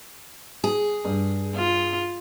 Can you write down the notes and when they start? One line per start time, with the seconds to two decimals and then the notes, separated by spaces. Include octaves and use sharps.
0.64 G#4
1.04 G2
1.55 F4